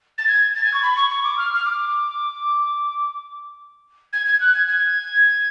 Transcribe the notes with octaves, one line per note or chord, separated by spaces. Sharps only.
A6
G#6
A6
G#6
C#6
B5
C#6
C#6
D6
F6
F6
D6
G#6
G#6
F#6
G#6
G#6